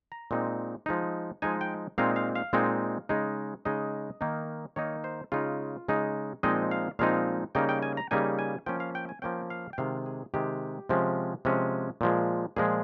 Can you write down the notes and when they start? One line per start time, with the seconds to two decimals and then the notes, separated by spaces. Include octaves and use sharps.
0.12 A#5
0.31 A#2 G#3 C4 D#4
0.86 F3 G#3 D#4
1.42 F3 G#3 D#4 G#5
1.61 G5
1.98 A#2 G#3 C4 D#4 F5
2.16 F5
2.35 F5
2.53 A#2 G#3 C4 D#4
3.09 C#3 G#3 D#4
3.65 C#3 G#3 D#4 D#5
4.21 D#3 A#3 D#4
4.76 D#3 A#3 D#4 C#5
5.04 C5
5.32 C#3 G#3 D#4 F4
5.88 C#3 G#3 D#4
6.43 A#2 F3 G#3 C4 D#4 D#5
6.71 F5
6.99 A#2 F3 G#3 C4 D#4 F5
7.55 C#3 G3 A#3 D#4 G5
7.69 G5
7.82 G#5
7.97 A#5
8.11 C#3 G3 A#3 D#4 G#5
8.39 G#5
8.66 F3 A#3 C#4 G5
8.80 F5
8.95 G5
9.09 G#5
9.22 F3 A#3 C#4 G5
9.50 F5
9.73 G5
9.78 C3 D#3 G#3 F5
10.06 G#4
10.34 C3 D#3 G#3 G4
10.89 C3 F3 G#3 C#4
11.45 C3 F3 G#3 C#4
12.01 A#2 F3 G#3
12.56 A#2 F3 G#3 G#4